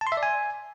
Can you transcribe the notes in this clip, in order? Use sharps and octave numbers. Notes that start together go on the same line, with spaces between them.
A5
C6
E5
D5
G#5